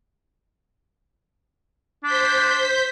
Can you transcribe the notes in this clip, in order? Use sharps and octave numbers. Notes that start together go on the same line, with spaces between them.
D4 C5 G6 B6